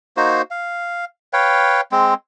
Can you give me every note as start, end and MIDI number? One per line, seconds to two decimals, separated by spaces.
0.17 0.42 58
0.17 0.42 63
0.17 0.42 66
0.17 0.42 72
0.51 1.05 77
1.33 1.81 71
1.33 1.81 73
1.33 1.81 77
1.33 1.81 79
1.92 2.14 56
1.92 2.14 60